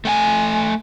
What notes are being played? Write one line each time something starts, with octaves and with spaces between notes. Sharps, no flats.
A3 G5 G#5